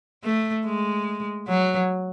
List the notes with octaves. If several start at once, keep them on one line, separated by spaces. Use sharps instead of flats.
A3
G#3
F#3